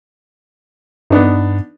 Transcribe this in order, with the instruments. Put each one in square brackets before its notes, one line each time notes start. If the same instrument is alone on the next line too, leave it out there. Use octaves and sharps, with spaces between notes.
[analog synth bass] G2 [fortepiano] B3 D4 D#4